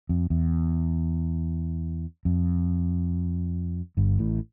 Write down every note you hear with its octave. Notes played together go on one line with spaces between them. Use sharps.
F2
E2
F2
G1 G2
A1 A2